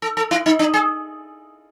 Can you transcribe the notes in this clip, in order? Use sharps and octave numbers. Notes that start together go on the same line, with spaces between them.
A4
A4
E4
D#4
D4
G#4